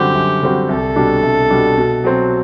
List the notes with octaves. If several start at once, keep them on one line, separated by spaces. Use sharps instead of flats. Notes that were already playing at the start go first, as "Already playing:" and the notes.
Already playing: F#2 D3 G3 C4 F#4 G4
F#2
D3 G3 C4 F#4
C2 A4
B2 G3 D4
C2
B2 G3 D4
B2
F#3 C4